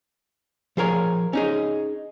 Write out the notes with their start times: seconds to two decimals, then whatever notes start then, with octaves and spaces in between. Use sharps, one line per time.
0.77 F3 G#4 A#4 C#5
1.33 C#4 D#4 G#4